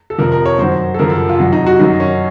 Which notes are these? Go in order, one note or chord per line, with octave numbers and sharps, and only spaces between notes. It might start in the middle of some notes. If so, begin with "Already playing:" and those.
A4
F2 C3 F3 A#4
A#4
C#5
F#2 D#3 F#3 C5
A4
F#2 C#3 F3 A#4
A4
F4
F2 C3 F#3
D#4
F#4
F#2 D#3 F#3 D#4
C#4